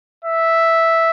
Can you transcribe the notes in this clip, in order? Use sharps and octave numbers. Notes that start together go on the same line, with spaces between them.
E5